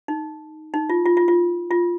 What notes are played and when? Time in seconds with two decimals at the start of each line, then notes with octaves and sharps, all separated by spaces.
0.08 D#4
0.74 D#4
0.89 F4
1.06 F4
1.17 F4
1.28 F4
1.71 F4